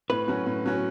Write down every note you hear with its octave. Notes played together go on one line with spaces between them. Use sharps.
A2 B4
F#3 C#4 F#4
A2
F#3 C#4 F#4